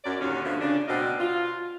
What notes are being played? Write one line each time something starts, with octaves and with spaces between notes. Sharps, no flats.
F#2 D5
D#2 A#2 D3 C#4
B2 D3 F3 A3
C#3 D4
D2 B2 C4 A#4 D5 D#5
F4